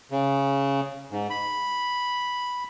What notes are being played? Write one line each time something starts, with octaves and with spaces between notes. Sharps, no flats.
C#3
G#2
B5